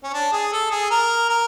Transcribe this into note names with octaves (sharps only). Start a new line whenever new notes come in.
C#4
D4
G#4
A4
G#4
A#4
A#4